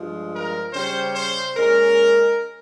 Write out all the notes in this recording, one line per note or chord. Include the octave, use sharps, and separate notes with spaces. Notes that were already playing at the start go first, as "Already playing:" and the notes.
Already playing: G2 F3 G#3
A#4
C#3 G3 C#4 C5
C5
A#2 G#3 C#4 A#4